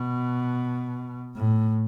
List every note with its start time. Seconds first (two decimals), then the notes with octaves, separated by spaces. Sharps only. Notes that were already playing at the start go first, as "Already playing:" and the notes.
Already playing: B2
1.35 A2